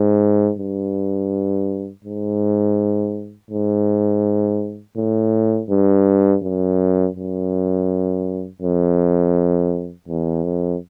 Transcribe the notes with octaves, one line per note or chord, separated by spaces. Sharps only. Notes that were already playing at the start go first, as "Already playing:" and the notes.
Already playing: G#2
G2
G#2
G#2
A2
G2
F#2
F#2
F2
E2
F2